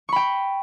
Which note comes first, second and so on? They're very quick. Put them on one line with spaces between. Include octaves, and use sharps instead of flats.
C#6 B5 G5